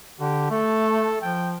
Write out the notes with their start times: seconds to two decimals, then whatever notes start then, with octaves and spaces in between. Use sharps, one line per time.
0.20 D3 G4
0.50 A3 A4
1.22 F3 G5